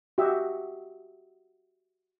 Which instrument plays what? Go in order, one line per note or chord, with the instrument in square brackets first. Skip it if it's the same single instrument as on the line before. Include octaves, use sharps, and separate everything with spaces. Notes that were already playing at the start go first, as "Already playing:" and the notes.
[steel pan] F#4 G4 D#5 E5